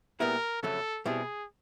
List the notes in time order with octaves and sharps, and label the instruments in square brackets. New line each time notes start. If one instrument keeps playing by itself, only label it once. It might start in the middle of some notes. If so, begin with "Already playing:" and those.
[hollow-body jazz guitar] A#2 G3 B3 E4 G#4 [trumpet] A#4
[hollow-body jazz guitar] F2 C#3 F#3 A3 [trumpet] A4
[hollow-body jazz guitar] B2 G3 C4 E4 G4 [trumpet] G#4